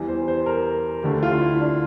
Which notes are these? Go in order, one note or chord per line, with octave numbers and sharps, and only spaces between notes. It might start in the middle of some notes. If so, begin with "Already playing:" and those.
Already playing: E2 E3 G3
C5
C5
A#4
D2 D3 A3 G4
F4
E4
D4